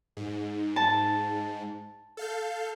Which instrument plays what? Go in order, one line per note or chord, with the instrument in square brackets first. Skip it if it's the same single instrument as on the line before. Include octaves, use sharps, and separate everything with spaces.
[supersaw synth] G#2
[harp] A5
[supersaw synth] A4 F5 G6